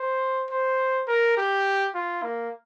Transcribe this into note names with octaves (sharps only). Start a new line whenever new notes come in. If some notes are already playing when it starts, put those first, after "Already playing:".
Already playing: C5
C5
A#4
G4
F4
A#3